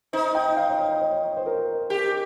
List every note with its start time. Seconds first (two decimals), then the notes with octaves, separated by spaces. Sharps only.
0.13 D#4 C5
0.35 G5
0.57 F5
0.70 C#5
0.79 D#5
1.02 C#5
1.37 C5
1.46 A#4
1.90 G4 A#4